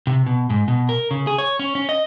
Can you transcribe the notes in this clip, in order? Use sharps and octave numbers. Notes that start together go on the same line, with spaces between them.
C3
B2
G#2
B2
A#4
C#3
G#4
C#5
C#4
C#4
D#5